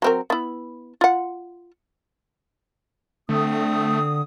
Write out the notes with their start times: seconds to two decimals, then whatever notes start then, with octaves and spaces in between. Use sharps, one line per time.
0.02 F#3 C4 A#4
0.30 B3 E4
1.01 F4 F#5
3.29 D3 A3 C4 D#6